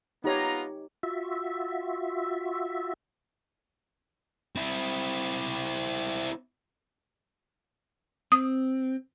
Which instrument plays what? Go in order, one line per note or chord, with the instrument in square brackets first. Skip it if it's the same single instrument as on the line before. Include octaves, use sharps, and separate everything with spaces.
[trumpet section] B3 F4 A#5 [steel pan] D#4 G4 C#5
[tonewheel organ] F4 F#4 E5
[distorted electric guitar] C4 E4
[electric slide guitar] C4 [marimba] D#6